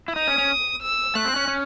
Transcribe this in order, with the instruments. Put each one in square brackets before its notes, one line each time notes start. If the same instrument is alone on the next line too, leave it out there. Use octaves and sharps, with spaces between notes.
[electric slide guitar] E4
[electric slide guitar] D#4 [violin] D#6
[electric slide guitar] C#4
C#4
[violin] E6
[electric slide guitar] A3 [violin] F#6
[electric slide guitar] C4
C#4
C#4